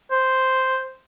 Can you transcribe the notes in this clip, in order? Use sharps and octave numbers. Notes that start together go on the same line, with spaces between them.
C5